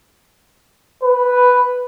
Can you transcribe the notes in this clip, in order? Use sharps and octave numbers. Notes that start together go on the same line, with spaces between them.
B4